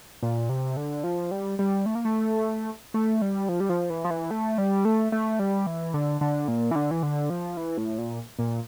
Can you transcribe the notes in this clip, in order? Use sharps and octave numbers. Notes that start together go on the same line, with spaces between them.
A#2
C3
D3
F3
G3
G3
A3
A#3
A3
A3
G3
F3
G3
F3
E3
F3
E3
A3
G3
A3
A3
G3
E3
D3
D3
A#2
E3
D3
E3
D3
F3
E3
A2
A#2
A#2